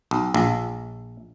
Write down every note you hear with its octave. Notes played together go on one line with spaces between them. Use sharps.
B1
A#1